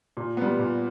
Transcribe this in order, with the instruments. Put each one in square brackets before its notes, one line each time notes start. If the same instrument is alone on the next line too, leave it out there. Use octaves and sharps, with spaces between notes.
[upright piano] A#2
G3 B3
A#2